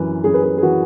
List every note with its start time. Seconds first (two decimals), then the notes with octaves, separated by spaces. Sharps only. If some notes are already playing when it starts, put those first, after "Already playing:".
Already playing: F#2 E3 B4
0.24 F#2 G#4
0.34 B4
0.44 G#4
0.58 G#4
0.63 E3 F#4